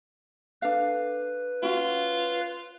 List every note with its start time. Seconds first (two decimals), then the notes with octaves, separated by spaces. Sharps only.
0.62 D4 A4 B4 F5
1.63 C#4 F4 F#4